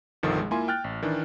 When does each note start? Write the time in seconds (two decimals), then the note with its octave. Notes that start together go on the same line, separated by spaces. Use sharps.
0.23 G1 C2 D#3 F3 A4
0.38 G#3
0.51 A#3 E4 F4 G#5 C6
0.68 G5 F6 F#6 A6
0.84 A1
1.02 D#3 E3 D4